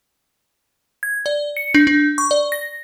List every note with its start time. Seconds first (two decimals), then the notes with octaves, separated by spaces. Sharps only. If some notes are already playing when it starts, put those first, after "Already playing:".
1.03 G#6
1.26 D5
1.57 C#7
1.74 D4
1.87 D4
2.18 C#6
2.31 D5
2.52 A#6